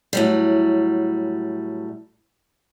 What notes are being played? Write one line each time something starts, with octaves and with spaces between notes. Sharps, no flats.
A2 F#3 G3